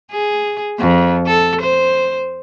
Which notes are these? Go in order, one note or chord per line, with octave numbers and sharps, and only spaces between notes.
G#4
F2
A4
C5